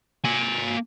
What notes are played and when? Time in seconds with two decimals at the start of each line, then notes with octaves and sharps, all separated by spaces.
0.25 A#3 G#5